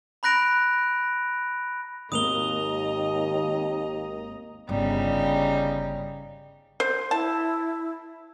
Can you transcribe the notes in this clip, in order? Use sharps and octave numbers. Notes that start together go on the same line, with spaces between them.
A#5 B5 F#6 A#6 D7 F7
G#1 D#2 A#3 D#5 A#5 D#6 F7 G7
G1 C#3 G3 D#4
C5
E4 A5